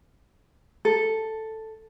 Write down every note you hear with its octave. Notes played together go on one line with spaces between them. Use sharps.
A4